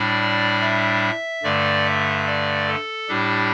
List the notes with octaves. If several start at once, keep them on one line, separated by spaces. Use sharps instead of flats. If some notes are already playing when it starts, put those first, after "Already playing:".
Already playing: A2 G3 D4 D5
E5
G2 D3 A3 D5
E5
D5
A4
A2 G3 D4 G4